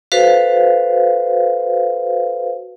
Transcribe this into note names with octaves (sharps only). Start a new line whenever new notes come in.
F#4 A4 B4 C5 F5